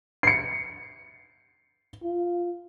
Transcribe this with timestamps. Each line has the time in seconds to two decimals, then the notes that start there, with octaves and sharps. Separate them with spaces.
0.23 C7 C#7
2.02 F4